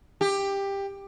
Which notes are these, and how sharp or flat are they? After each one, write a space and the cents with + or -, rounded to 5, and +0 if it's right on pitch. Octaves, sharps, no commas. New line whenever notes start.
G4 +15